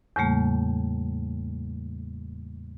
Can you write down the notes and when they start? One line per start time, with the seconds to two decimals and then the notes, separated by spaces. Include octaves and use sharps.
0.16 E2 A2 C#3 G3 A3 A#3